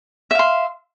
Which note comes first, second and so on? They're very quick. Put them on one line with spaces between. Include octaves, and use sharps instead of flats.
E5 F5 C6